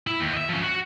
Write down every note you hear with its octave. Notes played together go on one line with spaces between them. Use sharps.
E4
D#2
D#5 E5
F3 C#4
F#4